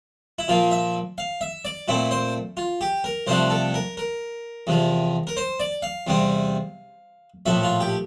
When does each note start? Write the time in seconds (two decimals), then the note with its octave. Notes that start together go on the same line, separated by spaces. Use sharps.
0.39 E4
0.48 A#2 F3 A#3 F4
0.71 E5
1.18 F5
1.41 E5
1.65 D5
1.88 A#2 A3 C4 E4
2.11 C5
2.57 F4
2.81 G4
3.04 A#4
3.27 C2 C3 F3 A3 D4 C5
3.50 A4
3.74 A#4
3.97 A#4
4.67 E2 C3 F3
5.27 A#4
5.37 C5
5.60 D5
5.82 F5
6.07 E2 C3 G3 C4
7.46 A#1 A2 F3 A3 E5
7.63 F4
7.80 G4